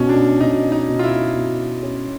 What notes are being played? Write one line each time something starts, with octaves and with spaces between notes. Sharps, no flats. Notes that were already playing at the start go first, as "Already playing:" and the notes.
Already playing: B2 C#4 D#4
D4
B2 D#4
D#4
B2
F4
E4
B2
C#4